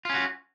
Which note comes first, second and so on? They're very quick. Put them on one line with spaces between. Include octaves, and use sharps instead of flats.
F4 C#4 F#4